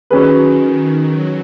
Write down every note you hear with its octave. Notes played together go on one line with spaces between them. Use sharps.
D#3 F#3 C#4 G#4 B4
F#3